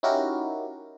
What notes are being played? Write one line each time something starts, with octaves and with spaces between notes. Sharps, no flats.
C#4 D#4 E4 F#4 G4 A#4